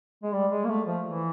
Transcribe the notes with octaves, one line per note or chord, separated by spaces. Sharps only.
G#3
G3
G#3
A#3
A3
F3
E3